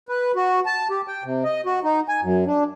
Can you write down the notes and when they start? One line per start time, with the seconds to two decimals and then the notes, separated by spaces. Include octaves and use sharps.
0.09 B4
0.36 F#4
0.66 A5
0.90 G4
1.08 G5
1.24 C3
1.44 D#5
1.66 F#4
1.84 D#4
2.08 G#5
2.22 F#2
2.47 D4